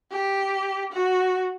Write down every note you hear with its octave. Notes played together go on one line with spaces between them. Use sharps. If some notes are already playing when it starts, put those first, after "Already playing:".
G4
F#4